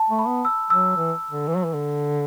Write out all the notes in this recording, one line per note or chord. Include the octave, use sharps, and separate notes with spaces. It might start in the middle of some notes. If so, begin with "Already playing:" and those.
Already playing: A5
A3
B5
B3
E6
F#3 E6
E3
D3
E3
F#3
E3
D3